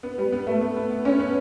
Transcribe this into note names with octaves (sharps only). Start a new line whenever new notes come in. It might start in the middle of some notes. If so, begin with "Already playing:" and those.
B3
G3
B3
A3
B3
B3
B3
C#4
B3